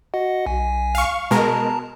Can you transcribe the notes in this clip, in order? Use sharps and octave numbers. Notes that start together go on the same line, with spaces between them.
F#4 D#5 F#5
B1 G#5
F5 C#6
B2 G#3 A#4 A5 A#5